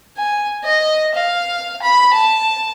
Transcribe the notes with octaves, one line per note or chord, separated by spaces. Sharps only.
G#5
D#5
F5
B5
A5